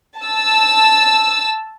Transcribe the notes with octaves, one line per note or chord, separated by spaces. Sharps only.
A5 E6